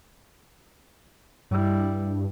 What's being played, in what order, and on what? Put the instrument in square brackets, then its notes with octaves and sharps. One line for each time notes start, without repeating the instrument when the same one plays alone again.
[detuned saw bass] G2 [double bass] G3 E4